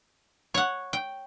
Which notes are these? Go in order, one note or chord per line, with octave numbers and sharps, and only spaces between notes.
C#5 F#5
G5